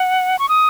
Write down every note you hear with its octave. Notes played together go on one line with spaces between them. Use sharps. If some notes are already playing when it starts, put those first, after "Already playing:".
Already playing: F#5
C#6
D#6